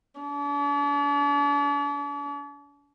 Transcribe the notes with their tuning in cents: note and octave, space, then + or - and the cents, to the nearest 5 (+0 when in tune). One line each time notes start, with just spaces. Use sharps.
D4 -45